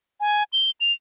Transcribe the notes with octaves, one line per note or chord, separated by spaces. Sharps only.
G#5
G7
F7